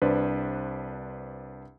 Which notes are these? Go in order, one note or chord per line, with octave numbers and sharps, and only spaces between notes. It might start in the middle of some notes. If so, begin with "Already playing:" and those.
C2 D4 B4 C5